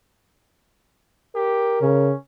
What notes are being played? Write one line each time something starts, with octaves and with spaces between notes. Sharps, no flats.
G4 A#4
C#3 C#4